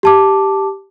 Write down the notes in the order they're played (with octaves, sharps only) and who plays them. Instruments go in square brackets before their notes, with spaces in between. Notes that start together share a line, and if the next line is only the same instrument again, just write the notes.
[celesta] G4 A5 D6